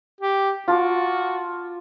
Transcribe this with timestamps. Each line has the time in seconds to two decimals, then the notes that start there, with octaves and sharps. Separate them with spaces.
0.20 G4
0.68 F4 F#4 A5 D6